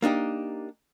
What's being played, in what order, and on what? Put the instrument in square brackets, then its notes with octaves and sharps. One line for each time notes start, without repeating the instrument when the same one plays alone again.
[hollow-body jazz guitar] A#3 D4 D#4 G4